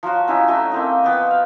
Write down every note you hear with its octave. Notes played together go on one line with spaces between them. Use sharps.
F3 F#3 F4 F#4
F#3 C#4 D#4 E4
F#3 A3 D#4 E4
A#3 C4 D#4
F3 B3 G5 B5
F5